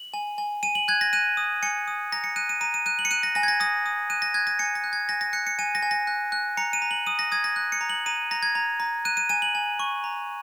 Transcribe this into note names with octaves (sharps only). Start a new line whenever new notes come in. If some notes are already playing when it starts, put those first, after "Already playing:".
Already playing: F#7
G#5
G#5
G#5 D#7
F#7
F#6 G#6
A#6
F#6 D#7
D#6
G#5 C#7
D#6
A#5 A#6
C#7
F#6 D#7
D#7
A#5 D#7
D#7
F#6 D#7
F#7
C#7
F#6 D#7
A#6
G#5 A#6
G#6
A#6
D#6 A#6
D#6
F#6 D#7
A#6
F#6 G#6
A#6
G#5 C#7
A#6
F#6
G#6
G#5 A#6
A#6
F#6 C#7
C#7
G#5 D#7
A#6
G#5
A#6
F#6
F#6
A#5 C#7
D#7
A#5
F#7
D#6 D#7
A#6
D#6 G#6
A#6
F#6
C#7
A#5
F#7
A#5 D#7
A#5 A#6
G#6
A#5
A#5
F#6 D#7
D#7
G#5 D#7
F#7
G#5
C#6
A#5